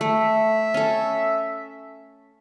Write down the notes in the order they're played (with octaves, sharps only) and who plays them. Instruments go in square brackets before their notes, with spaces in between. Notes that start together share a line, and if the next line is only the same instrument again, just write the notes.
[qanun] A3 [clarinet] E5
[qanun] C#4 A4